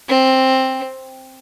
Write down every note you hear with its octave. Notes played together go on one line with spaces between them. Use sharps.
C4